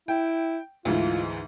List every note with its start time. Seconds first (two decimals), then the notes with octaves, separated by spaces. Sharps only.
0.08 E4 G5
0.85 D2 G#2 E3 F4